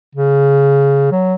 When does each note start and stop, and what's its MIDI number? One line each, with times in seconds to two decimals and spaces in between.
0.15 1.08 49
1.11 1.35 54